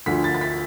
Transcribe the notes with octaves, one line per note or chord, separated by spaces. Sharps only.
D2 D3 F3 B6
A6
A6
B6